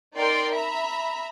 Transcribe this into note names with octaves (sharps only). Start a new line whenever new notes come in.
D#4 A#4 D5 G5 C6
E5 A#5 B5